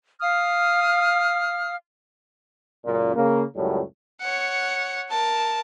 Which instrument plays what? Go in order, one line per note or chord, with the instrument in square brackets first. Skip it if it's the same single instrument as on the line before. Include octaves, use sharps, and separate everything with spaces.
[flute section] F5 D#6 F6
[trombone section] C#2 F#2 A#2
C#3 A#3
C#2 F#2 A2 G3
[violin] C#5 F#5
A#4 A5